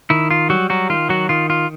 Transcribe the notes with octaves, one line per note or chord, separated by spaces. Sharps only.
D#3 E4
F4
F#3 G3 F#4
F#3 F#4
D#3 F4
F#3 F#4
D#3 F4
F4